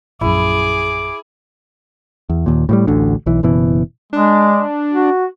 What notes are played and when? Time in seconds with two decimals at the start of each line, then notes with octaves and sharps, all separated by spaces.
0.21 A#1 F#2 E4 G#4 D6
2.30 E2
2.46 D#2 A#2
2.69 A2 F3 G3
2.87 A1 D2 D3
3.26 B1 E3
3.43 F#1 B2 E3
4.13 G#3 D4
4.92 F#4